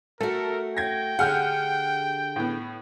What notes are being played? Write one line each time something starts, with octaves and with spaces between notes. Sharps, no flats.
A3 F#4 A4 A#4
G5 G#6 A#6
D3 G4 G#4 F#5 F6 G6
A2 B3